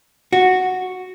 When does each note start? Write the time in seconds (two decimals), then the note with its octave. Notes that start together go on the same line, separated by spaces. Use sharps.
0.33 F#4